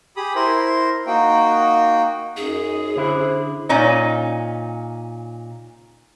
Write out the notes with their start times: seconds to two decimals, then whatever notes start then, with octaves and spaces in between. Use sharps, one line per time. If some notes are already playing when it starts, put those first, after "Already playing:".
0.17 G4 G#4 B5 D#6
0.35 E4 A#4 C5 C6
1.07 A#3 D#4 F#4 G5
2.37 F#2 D#4 G#4
2.97 D3 E4 C5
3.69 A#2 C#4 D#4